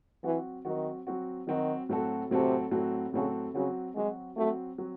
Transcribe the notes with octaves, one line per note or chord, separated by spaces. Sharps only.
E3 F#3 C4 F#4
D#3 F#3 C4 F#4
F#3 C4 F#4
D#3 F#3 C4 F#4
A2 F#3 C4 F#4 A4
A2 C3 F#3 C4 F#4 A4
A2 F#3 C4 F#4 A4
A2 C#3 F#3 C4 F#4 A4
C#3 F#3 C4 F#4
F#3 G#3 C4 F#4
F#3 A3 C4 F#4
F#3 C4 F#4